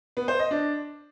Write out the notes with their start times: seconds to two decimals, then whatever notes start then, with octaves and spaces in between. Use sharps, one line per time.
0.17 B3
0.28 C5
0.39 D#5
0.51 D4